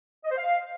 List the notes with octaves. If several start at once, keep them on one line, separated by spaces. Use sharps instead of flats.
D#5
C5
F5